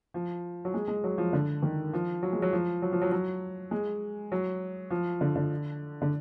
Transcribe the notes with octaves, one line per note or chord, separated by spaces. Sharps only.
F3
F#3
G#3
G#3
F#3
F3
D3
D#3
F3
F#3
G#3
F#3
F3
F#3
F3
F#3
F#3
G#3
F#3
F3
D3
D3
D3